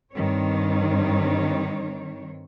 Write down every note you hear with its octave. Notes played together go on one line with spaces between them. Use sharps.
G2 D#3 C4 C#5